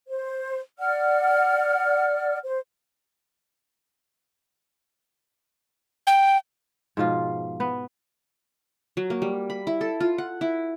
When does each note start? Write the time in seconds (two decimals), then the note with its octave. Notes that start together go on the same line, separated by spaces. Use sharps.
0.08 C5
0.78 D5 F#5 F6
2.44 C5
6.07 G5
6.97 G#2 B2 F3 F4
7.60 B3 B4
8.97 F#3
9.10 A#3
9.22 G3
9.50 B5
9.67 E4
9.81 A4
10.00 F4
10.18 F#5
10.41 E4